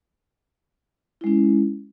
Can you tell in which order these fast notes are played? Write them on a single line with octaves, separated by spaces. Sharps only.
E4 G#3 C#4